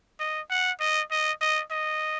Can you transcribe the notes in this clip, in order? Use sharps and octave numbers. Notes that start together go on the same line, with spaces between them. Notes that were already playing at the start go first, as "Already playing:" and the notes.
D#5
F#5
D#5
D#5
D#5
D#5